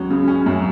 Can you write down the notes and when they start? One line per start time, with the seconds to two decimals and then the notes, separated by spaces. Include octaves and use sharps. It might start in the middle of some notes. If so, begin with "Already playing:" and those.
Already playing: C#2 F#3 C#4
0.10 C#3
0.28 C#4
0.46 F#2